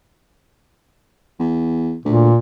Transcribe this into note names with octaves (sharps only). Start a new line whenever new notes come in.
E2
D2 A#2